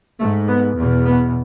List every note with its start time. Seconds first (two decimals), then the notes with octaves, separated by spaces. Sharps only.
0.19 G#2 A3
0.48 B3
0.77 E2 B2
1.05 B3